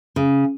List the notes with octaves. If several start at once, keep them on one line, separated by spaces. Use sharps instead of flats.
C#3